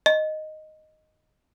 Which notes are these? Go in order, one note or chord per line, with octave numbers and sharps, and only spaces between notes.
D#5